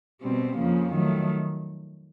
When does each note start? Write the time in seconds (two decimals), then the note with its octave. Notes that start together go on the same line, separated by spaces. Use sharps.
0.22 B2 G3 C4
0.58 F2 C#3 F3 A#3
0.94 D#3 F#3 A3